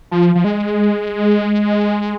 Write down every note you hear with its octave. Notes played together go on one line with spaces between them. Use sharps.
F3
F3
G#3